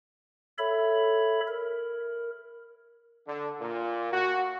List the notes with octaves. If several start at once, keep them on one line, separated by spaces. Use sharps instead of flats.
A4 C#5 E5 B5
A#4
D3
A#2
F#4